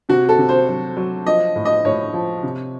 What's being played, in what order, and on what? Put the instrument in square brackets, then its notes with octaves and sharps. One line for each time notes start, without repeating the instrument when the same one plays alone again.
[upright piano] C3 F#4
A4
C3
C5
F#3
F#3
F3 D#5
A2
D#5
A2 C#5
F3
C3